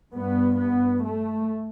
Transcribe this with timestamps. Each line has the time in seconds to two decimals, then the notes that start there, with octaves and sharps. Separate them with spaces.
0.14 G2 B3
0.60 B3
1.06 A3